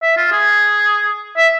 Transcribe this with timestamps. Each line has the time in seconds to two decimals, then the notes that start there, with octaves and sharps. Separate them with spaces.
0.02 E5
0.17 F4
0.32 G#4
1.37 E5